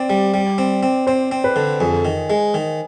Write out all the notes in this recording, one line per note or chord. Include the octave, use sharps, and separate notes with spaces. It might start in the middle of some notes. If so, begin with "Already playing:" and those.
Already playing: C4 D5
G3
G3
C4
C4
C4 C5
C4
B4
D3
F2 G#4
D#3
G#3
D#3